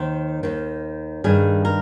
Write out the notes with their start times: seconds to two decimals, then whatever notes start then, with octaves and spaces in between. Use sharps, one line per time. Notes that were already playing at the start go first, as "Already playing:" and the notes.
Already playing: D#2 D#3 C5
0.43 D#2 D#3
1.24 G2 D#3 G#4
1.65 A#4